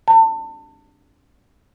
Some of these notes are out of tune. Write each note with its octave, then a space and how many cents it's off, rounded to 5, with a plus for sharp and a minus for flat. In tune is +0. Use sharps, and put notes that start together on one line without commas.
A5 +30